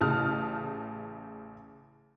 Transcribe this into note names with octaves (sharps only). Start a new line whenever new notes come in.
A1 C#3 A5 D#6 F6